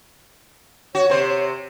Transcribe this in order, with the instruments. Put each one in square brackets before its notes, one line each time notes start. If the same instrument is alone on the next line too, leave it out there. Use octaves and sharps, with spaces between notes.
[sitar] F#4 [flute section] C#5
[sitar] C3 C5